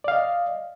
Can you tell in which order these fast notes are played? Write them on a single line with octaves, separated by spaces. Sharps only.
D5 F5 D#5